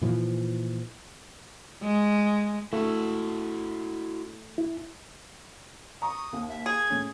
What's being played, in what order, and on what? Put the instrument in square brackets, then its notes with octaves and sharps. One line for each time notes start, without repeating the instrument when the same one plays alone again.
[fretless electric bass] A#2 E3 F3
[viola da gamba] G#3
[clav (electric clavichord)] A3 [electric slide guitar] E4 F#4
[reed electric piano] E4
[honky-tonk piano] A#5 C#6 [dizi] D#6
[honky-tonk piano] D#2
[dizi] E5
[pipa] G#4 [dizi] G#6
[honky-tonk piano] A2 C#4